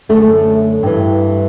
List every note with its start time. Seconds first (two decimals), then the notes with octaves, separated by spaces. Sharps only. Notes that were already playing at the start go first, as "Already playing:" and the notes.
0.09 F#2 D3 A3
0.83 G2 E3